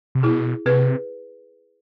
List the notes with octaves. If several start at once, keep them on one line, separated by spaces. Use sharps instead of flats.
C3
B2 E4 G#4
C3 G#4 B4